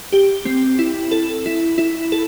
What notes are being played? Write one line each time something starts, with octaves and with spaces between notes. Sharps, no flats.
G4
C4
E4
A4
E4
E4
A4